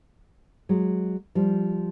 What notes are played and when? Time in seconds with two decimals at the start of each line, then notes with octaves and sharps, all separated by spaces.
0.69 F#3 G#3
1.35 F3 G3